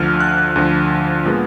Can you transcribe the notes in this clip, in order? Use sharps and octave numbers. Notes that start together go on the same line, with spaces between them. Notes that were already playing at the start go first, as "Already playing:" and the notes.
Already playing: D2 D3 F3 F6
F#6
D2 D3 F3
A#2 G#3 B3